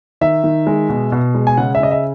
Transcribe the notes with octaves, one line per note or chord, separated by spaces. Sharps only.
D#3 E5
D#3
G#3
B2
B2
G#3
G#5
C#3 F#5
E5
C#3 D#5
E5